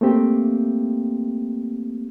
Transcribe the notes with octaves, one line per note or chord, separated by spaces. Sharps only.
A3 A#3 C4 G4